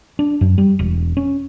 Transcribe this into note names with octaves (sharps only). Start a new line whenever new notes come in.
D4
F#2
G3
E1
C#4